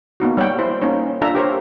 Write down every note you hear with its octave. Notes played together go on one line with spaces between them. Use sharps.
A#3 B3 D#4 F#4
G3 C#5 F#5 G5
E4 C5
A#3 C#4 D#4 C#5
D4 F4 A4 E5 A#5
G4 A#4 C5 C#5